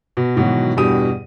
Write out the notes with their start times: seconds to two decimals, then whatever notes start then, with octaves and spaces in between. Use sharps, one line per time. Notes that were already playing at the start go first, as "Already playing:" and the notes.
0.17 B2
0.36 G#2 B2 D#3 E3 F#3
0.77 E2 G2 B2 G4 D#6 D#7